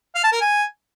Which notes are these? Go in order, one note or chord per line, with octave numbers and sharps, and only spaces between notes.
F5
A5
A#4
G#5